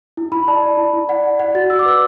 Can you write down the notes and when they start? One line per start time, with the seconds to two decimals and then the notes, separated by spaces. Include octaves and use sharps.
0.17 E4
0.32 E4 B5
0.48 D5 A5
0.62 D5
0.77 E4
0.93 E4
1.09 D5 F#5
1.24 D5
1.39 D5 F#5
1.55 F#4 A6
1.70 F#4 E6
1.79 D6
1.85 B4 E6